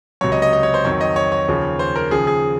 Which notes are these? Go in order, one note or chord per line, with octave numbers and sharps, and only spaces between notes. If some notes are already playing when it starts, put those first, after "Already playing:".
C#2 C3 F#3 C#5
D#5
D#5
D#5
C#5
C5
F2 D#3 F#3 C#5
D#5
C#5
C#5
D#2 C#3 F3
C5
A#4
D#2 C#3 F3 G#4
G#4